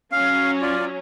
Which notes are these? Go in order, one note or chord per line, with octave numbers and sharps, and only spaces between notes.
F#3 C#4 F5
F4 D5